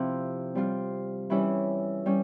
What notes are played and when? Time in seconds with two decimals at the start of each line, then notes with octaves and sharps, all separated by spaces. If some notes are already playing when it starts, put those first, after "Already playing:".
Already playing: C3 F3 C4 E4
0.55 G3 C4 F4
1.30 E3 G3 C#4 E4
2.06 G3 C#4